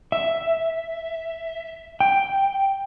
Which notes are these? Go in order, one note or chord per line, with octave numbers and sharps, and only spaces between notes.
E5
G5